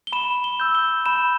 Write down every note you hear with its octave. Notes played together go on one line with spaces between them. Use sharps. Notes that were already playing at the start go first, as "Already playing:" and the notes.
G7
B5 E7
G7
E6 G6
G7
B5 E7